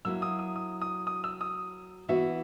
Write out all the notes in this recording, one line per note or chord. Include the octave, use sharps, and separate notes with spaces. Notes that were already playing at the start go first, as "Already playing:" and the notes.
F#3 A#3 E4 E6
D#6
D#6
D#6
D#6
D#6
E6
D#6
E3 B3 F#4 E5